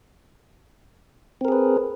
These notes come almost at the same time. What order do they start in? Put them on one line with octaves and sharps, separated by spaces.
C4 A#4 G#4 B4